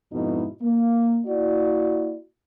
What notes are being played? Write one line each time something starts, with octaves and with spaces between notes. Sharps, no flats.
F2 G#2 B2 D#4 E4
A#3
A#3 E4 F#4 D5